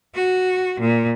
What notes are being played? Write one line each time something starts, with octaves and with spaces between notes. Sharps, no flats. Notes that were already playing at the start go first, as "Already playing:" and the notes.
F#4
A#2